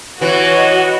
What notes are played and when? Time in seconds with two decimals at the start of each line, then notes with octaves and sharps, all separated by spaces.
0.21 E3 F#4 C#5
0.53 D#5 B5